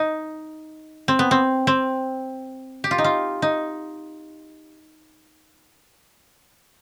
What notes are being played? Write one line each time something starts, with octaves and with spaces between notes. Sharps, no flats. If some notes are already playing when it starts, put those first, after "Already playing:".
Already playing: D#4
C4
B3
C4
C4
G4
F4
D#4
F4
D#4